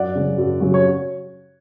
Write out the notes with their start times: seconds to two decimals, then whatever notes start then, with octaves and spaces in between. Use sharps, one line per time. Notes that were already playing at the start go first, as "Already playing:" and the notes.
Already playing: F#2 D5 F#5
0.15 C#3 F#3
0.38 F#2
0.60 C#3 F#3
0.74 C#5